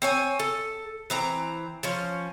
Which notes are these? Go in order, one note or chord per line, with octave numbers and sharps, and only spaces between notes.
C4 C#5 G#5
A4
E3 C4 A#5
F3 C#4